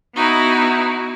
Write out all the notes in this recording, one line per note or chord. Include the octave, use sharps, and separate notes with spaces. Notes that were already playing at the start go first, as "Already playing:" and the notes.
B3 D#4 E4 F#4